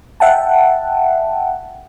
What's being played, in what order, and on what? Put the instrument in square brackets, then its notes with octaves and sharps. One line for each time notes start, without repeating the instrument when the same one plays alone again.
[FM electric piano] E5 F#5 G5 A5